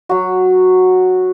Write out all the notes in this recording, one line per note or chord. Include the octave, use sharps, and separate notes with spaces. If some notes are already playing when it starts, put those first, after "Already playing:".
F#3 F#4